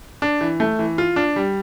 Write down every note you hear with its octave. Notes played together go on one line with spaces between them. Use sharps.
D4
E3
A3
E3
F4
D4
G3